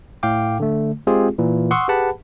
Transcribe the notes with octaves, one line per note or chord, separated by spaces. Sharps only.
A2 F5 G5 D6
D3 A3
G#3 C4 F4 G4 G#4
A#2 E3
F#5 C6 C#6 D#6 E6
G4 G#4 B4 F#5 A5 B5